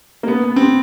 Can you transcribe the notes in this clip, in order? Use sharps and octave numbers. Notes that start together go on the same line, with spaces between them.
A#3
B3
B3
C4